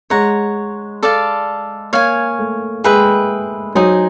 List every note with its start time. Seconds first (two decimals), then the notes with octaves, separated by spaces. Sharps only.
0.10 G#3 C#5 F#5 A#5
1.03 A4 D5 F5
1.93 A#3 C#5 F5 G#5
2.39 A3
2.84 G#3 G#4 B4 E5 G5
3.75 F#3 D#4 G#4 C5